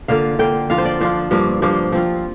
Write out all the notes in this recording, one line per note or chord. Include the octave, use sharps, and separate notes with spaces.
D3 A#3 F4 F5
D3 A#3 F4 G5
F3 D4 F4 F5
C5
D5
F3 D4 F4 C5
G2 F3 A#3 D4
G2 F3 A#3 D4 C5
F3 C4 F4